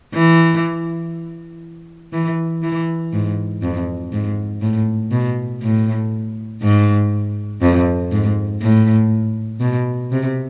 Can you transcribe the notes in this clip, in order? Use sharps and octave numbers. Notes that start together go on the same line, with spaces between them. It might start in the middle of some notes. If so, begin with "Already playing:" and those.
E3
E3
E3
G#2
F2
G#2
A2
B2
A2
G#2
F2
G#2
A2
B2
C3